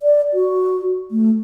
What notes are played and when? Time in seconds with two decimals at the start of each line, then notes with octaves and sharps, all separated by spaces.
0.01 D5
0.33 F#4
1.11 A3